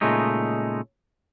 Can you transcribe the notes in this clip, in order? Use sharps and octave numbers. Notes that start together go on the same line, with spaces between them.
A#2 C#3 G#3 A3 D#4